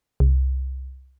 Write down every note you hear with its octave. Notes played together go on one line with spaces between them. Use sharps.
C2